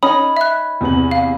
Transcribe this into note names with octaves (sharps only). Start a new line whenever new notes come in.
C#4 D#4 B5 D#6
E5 F#6
E2 C3 F#7
F5